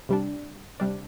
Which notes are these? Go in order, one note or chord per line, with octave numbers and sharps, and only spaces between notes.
C3 G3 D4
C3 G3 D4